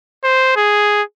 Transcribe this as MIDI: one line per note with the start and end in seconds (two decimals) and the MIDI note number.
0.24 0.53 72
0.56 1.02 68